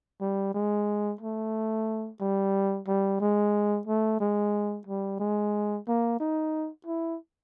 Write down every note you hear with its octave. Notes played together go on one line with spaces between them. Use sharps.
G3
G#3
A3
G3
G3
G#3
A3
G#3
G3
G#3
A#3
D#4
E4